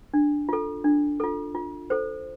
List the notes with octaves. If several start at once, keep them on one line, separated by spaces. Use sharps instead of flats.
D4
F4 A4
D4
F4 A4
F4
A4 C5